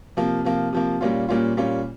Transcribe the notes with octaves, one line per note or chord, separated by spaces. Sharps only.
C3 F3 A#3
C3 F3 A#3
C3 F3 A#3
A#2 G3 A#3 C#4 F4
A#2 G3 A#3 C#4 F4
A#2 G3 A#3 C#4 F4